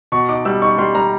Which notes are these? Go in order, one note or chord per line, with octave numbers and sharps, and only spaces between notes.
B2 C#6
D#4 D6
G3 E6
D#4 C#6
G3 C6
G3 A#5